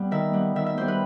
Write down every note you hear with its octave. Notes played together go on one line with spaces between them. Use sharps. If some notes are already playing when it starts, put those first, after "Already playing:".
Already playing: G3 B3
D#3 E5
G3 B3
D#3 E5
E5
G3 B3 C5
B4